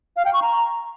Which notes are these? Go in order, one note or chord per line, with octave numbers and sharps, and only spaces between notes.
F5
G5
C#6
A#5